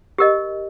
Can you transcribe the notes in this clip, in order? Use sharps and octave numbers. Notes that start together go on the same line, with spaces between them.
G4 A#4 D#5